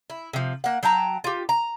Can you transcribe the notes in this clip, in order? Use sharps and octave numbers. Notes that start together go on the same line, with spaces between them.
E4
C3 F3
A#3 F#5
F#3 G5 A5 A#5
F4 G4
A#5